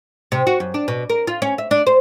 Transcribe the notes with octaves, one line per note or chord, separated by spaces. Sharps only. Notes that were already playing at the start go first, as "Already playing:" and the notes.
C3
F#4
F#2
D4
B2
A#4
F4
C#4
E5
D4
C5